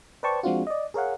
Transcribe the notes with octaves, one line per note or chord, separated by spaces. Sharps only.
B4 C5 D5 G5 A5 C#6
F3 G#3 C4 D4 F4 F#4
D5 D#5
G#4 A#4 C#5 F5 F#5